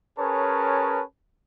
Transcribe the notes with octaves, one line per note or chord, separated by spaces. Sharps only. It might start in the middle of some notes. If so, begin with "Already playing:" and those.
C#4 G#4 A#4 B4 C#5 A5